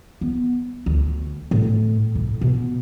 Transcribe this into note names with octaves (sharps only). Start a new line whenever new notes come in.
B3
D2
A2
A2
B2